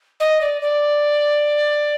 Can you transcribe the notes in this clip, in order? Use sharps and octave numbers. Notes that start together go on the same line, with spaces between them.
D#5
D5
D5